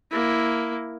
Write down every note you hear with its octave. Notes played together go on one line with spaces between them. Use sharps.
A#3 E4